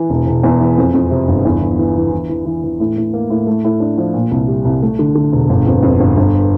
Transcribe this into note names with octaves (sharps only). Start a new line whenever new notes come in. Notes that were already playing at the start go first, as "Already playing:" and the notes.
Already playing: E3
E1
E1
E2
E3
F2
F2
C3
G1
E2
E3
E3
E3
E3
E3
E3
E3
A2
A2
A#3
A2
A3
A2
D4
F3
A#2
C2
G3
C2
A3
D3
D3
E1
G1
F2
F2
G1
G1